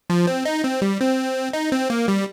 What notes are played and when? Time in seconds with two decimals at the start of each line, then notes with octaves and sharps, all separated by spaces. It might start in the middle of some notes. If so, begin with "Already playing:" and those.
0.10 F3
0.27 C4
0.45 D#4
0.64 C4
0.82 G3
1.00 C4
1.53 D#4
1.72 C4
1.90 A#3
2.08 G3